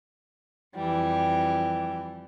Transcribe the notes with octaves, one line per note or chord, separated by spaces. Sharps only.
F2 E3 G3